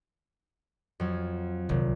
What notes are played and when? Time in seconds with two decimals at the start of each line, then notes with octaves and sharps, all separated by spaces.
1.00 F2 F#3
1.69 D#1 C2